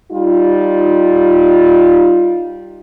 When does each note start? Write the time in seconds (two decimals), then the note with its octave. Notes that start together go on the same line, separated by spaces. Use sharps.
0.12 G3 D#4 F4